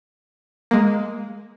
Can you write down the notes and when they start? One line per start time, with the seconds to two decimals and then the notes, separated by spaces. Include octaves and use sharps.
0.71 G#3 A#3